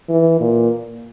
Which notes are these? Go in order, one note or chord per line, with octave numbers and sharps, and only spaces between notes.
E3
A#2